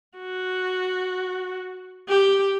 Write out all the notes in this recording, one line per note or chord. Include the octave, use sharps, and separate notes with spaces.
F#4
G4